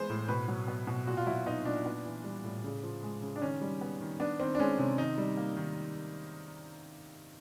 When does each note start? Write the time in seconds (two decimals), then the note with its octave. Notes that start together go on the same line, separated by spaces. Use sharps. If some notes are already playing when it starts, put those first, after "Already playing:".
Already playing: E3 G#3 B3 C5
0.10 A2
0.28 B2 B4
0.48 F#3
0.68 B3
0.87 B2
1.07 A#2 F#4
1.17 F4
1.27 F#3 E4
1.46 B3 D#4
1.65 A#2 D4
1.86 B3
2.05 E3
2.24 G3
2.44 A2
2.64 C#3
2.83 F3
3.03 G#3
3.22 C#3
3.36 D4
3.42 D#3 C#4
3.61 G3
3.81 B3
4.01 D#3
4.20 B3 D4
4.40 D#3 C4
4.55 D4
4.59 G#3 C#4
4.79 C3 C#4
4.98 D#3 D#4
5.18 G3
5.37 A#3
5.57 D#3